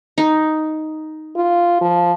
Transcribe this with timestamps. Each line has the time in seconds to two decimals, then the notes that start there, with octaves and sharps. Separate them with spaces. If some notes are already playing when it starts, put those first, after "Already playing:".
0.18 D#4
1.36 F4
1.81 F3